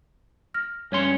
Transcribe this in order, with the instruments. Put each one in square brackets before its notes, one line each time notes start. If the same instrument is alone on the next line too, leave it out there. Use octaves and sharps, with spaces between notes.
[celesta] F6 A#6
[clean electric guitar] G2 C#4 C6 [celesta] C#5 G#6 C#7